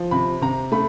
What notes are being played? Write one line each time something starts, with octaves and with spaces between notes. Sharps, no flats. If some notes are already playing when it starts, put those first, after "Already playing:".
Already playing: F3
C3 B5
C3 A#5
A3 B5